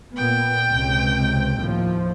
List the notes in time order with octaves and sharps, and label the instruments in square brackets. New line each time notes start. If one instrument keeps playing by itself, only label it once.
[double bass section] A#2 B3 [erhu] G5
[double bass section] C#2 C3
D#2 A2 F3